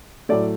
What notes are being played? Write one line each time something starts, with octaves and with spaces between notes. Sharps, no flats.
A2 F#3 A3 D5